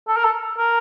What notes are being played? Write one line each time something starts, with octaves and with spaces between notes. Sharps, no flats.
A4
A#4
A4
A#4